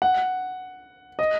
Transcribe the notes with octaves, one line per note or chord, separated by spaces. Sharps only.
F#5
D#5